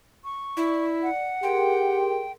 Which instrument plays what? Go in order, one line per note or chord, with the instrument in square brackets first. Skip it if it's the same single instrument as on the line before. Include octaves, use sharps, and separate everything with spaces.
[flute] C#6
[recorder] E4 [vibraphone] D5
[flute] F#5
[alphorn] G4 [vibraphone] G#4 A#4 C6 [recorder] G5